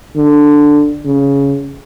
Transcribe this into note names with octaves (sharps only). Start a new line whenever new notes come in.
D3
C#3